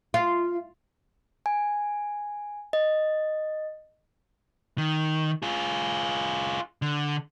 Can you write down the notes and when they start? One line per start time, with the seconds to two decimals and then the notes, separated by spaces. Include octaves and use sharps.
0.14 F4
1.46 G#5
2.73 D#5
4.78 D#3
5.42 F4 G#4
6.82 D3